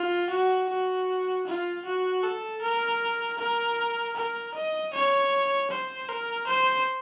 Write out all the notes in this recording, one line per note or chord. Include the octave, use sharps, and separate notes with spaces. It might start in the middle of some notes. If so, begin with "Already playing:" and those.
Already playing: F4
F#4
F#4
F4
F#4
A4
A#4
A#4
A#4
D#5
C#5
C5
A#4
C5